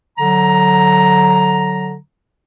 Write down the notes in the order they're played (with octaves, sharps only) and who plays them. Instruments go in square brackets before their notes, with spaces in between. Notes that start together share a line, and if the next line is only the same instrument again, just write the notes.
[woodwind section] D3 F#3 A#5